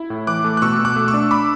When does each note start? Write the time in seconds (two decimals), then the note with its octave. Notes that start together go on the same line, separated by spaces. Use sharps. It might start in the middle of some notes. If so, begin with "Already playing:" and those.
Already playing: E4
0.10 A2
0.27 E3 D6 F#6
0.44 A3
0.57 F#6
0.62 B2 C#6 E6
0.79 B2
0.85 D6 F#6
0.96 A3
1.08 C#6 E6
1.14 D4
1.31 B5 D6